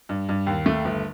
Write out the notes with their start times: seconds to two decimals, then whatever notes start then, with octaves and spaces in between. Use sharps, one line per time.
0.09 G2
0.29 G2
0.47 D#2
0.66 A3
0.85 G1